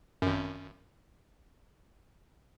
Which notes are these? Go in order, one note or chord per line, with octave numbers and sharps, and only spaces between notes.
G#1 F#2